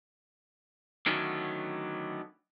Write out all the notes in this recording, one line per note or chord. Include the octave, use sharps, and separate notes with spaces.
D3 D#3 F#3 A3 B3 C#4